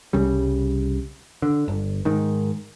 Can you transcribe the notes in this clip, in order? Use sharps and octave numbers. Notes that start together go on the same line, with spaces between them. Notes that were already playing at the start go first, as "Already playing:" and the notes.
C2 C#3 G3
D3
G1
G#2 D#3